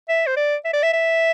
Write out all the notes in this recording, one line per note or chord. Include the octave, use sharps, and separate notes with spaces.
E5
C5
D5
E5
D5
E5
E5